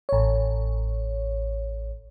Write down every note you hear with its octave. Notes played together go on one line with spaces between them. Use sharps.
A1 C#5